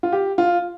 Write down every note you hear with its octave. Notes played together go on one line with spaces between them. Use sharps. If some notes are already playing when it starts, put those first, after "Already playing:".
F4
G4
F4